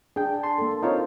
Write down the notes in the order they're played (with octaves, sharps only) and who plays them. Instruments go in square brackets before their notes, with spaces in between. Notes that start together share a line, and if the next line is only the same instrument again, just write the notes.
[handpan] D4 [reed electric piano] G#4 G5
[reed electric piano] A5 C6
[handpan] A#3 A4
[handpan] C4 C5 [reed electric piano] D#4 F4 C#5